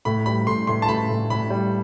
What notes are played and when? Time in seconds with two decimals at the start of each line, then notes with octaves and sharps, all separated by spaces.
0.05 A2 B5
0.26 G3 B5
0.47 A2 C6
0.67 A2 C6
0.82 A5
0.88 A2 B5
1.09 A2
1.30 A2 B5
1.50 G3